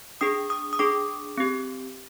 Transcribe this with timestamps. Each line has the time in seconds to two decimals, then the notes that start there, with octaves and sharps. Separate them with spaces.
0.21 D4 G#4 D#6
0.50 D#6
0.73 D#6
0.79 D4 G#4 D6
1.37 C4 G4